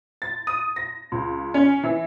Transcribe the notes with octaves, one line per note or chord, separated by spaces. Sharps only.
A6
D#6
A#6
C#2
C#4
E3